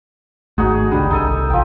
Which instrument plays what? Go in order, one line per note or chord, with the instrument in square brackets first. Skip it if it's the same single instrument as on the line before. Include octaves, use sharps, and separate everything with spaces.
[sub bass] G#1 [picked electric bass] G#2 A3 [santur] D#4 F#4 G#4
[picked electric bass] G1 C#2 D4 [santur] G3
[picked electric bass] C2 [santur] D#4 A4 G#5
[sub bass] A1 [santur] F3 G5